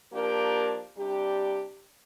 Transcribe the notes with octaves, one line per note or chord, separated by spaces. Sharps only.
F3 A#3 D4 G4 A#4
C3 G3 D4 G4